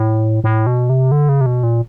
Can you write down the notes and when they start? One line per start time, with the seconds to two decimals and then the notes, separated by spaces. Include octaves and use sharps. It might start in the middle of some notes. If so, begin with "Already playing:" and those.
Already playing: A2
0.44 A2
0.67 B2
0.90 C3
1.12 D3
1.29 C#3
1.41 C3
1.46 B2
1.63 A#2